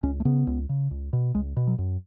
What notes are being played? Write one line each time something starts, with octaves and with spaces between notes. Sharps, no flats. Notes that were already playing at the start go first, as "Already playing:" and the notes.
C#2 C#4
A3
C#3 B3
C#2
C#3
C#2
B2
C#2 G#3
B2
F#3
F#2